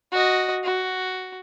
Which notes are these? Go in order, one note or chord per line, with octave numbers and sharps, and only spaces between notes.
F#4 D#5
F#4